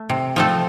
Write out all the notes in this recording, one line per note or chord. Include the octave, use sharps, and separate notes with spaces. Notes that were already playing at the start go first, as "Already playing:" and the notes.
Already playing: A3
C3
F3 A3 C4 A4